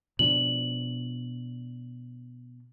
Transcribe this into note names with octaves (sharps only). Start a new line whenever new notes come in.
B2 F3 D4 F#7